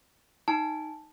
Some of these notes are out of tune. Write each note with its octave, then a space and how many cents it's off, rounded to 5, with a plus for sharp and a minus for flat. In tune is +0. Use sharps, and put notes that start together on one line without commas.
D#4 +0 A5 +0